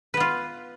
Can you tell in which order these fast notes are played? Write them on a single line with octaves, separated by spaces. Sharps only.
B4 B3 F4